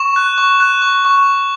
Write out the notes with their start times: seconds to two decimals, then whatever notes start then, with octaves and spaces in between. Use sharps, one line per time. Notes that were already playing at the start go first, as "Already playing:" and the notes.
Already playing: C#6 E7
0.16 F#6
0.38 C#6
0.60 F#6
0.82 C#6
1.05 C#6
1.26 C#6